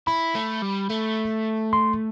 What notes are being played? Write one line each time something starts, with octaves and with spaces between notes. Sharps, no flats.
E4 B5
A3
G3
A3
C6